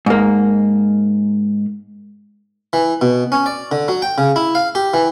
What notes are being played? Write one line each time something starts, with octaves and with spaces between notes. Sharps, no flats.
G#2 A#3
E3
B2
C#4
D5
D3
F#3
G5
C#3
E4
F5
G4
E3